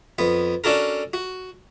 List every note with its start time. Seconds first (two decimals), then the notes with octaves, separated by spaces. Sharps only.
0.18 F2 B3
0.64 C#4 D4 F#4 A4 A#4
1.13 F#4